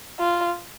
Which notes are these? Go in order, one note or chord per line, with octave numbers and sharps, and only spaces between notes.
F4